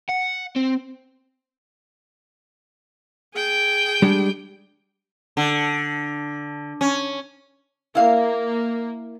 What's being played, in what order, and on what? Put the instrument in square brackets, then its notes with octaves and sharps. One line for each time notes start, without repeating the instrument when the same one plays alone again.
[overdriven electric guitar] F#5
C4
[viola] G#4 G5
[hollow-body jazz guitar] G3 G#3 D4
[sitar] D3
C#4
[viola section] A#3 [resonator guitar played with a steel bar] E4 F5